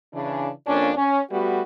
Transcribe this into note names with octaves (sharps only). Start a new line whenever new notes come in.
C#3 E3 D4
F2 A#3 C#4 D4
C#4
G3 A3 B3 F#4